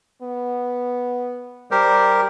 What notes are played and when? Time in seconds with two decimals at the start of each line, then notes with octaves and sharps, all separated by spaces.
0.22 B3
1.71 G3 G4 A#4 C5